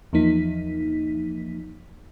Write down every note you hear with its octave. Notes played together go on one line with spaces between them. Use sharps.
E2 F3 A#3 D#4 B6